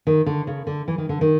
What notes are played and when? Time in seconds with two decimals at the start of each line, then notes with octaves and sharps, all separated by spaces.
0.07 D#3
0.26 D3
0.47 C#3
0.67 D3
0.88 E3
0.98 D#3
1.09 D3
1.21 D#3